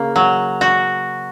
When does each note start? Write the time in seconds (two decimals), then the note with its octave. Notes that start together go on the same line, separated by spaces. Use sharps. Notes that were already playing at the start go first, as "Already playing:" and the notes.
Already playing: C#3 A#3
0.16 F#3
0.61 F#4